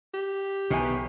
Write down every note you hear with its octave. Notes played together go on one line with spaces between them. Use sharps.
G4
B1 B2 D#3 E3 G#5